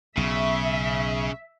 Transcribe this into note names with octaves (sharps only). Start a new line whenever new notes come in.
B1 C#3 E5